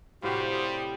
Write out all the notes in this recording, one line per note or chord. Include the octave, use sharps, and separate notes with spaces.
A2 C3 G3 F#4 G4 B4 C5 F5
G4 D#6